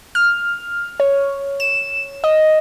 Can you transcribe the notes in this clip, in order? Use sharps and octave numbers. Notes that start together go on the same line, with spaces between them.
F6
C#5
E7
D#5